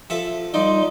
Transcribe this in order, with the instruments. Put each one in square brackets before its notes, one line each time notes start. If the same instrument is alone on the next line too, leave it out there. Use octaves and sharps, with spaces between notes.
[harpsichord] F3 A4 E5
[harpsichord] F3 D5 [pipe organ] G3 C6 [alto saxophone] D#4